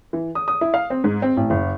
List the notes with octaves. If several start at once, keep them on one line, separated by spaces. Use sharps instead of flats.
E3
D#6
D#6
E4
F5
C4
G#2
C4
A1
F#1